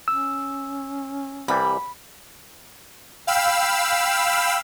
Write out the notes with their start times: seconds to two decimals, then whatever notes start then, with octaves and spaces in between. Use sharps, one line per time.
0.08 C#4 E6
1.48 C2 E3 G3 B5
3.27 F5 G5 B5 E6